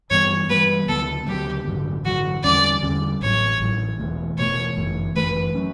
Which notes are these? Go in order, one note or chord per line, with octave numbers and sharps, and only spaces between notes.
G2 E3 G3 B3 C#5
G2 E3 G3 B3 B4
D2 C#3 F#3 B3 A4
D2 C#3 F#3 B3 G4
A1 G2 D3 F#3
A1 G2 D3 F#3 F#4
E2 D3 G3 C#4 D5
E2 D3 G3 C#4
A1 A2 F#3 C#5
A1 A2 F#3
E1 E2 B2 A3
E1 E2 B2 A3 C#5
G1 F#2 E3 A3
G1 F#2 E3 A3 B4
F#3 C#4